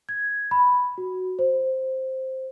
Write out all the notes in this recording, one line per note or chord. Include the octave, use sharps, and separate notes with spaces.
G#6
B5
F#4
C5